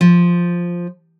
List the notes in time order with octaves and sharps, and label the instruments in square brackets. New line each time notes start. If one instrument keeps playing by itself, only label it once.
[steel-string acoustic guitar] F3